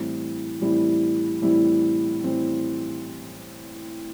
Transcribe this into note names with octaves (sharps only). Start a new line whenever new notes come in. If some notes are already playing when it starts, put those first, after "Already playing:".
Already playing: A2 E3 G3 C4 E4
A2 E3 G3 C4 E4
A2 E3 G3 C4 E4
A2 E3 G3 C4 E4